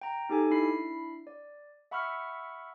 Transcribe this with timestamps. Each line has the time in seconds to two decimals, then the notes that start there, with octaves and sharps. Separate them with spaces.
0.02 G5 A#5
0.29 D#4 G4 A4 G#5
0.50 D4 E4 B5 C7
1.27 D5
1.91 E5 F#5 B5 C#6 E6 F6